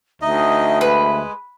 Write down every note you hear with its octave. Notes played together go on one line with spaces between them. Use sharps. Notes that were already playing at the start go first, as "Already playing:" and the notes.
D2 D#4 D#5 E5
G#3 B4